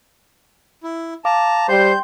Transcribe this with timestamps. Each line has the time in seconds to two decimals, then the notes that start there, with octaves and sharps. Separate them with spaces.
0.83 E4
1.25 F5 A5 A#5 D6
1.69 G3 C5 G5 C6 G6